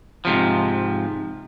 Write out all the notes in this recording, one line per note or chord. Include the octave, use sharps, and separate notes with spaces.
G#2 C3 F3